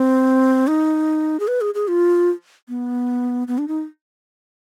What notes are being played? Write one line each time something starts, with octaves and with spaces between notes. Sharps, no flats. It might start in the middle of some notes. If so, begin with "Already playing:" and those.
Already playing: C4
D#4
G#4
B4
G#4
G#4
F4
B3
B3
D4
D#4